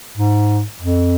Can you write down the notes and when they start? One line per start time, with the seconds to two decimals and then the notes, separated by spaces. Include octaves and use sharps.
0.17 G#2
0.82 F2